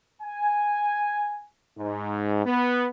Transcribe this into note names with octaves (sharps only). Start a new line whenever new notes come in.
G#5
G#2
B3